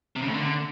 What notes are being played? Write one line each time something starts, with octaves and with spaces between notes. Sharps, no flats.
C3
C#3
A2
D3